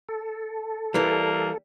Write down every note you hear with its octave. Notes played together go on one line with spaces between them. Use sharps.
A4
E3 G3 A#3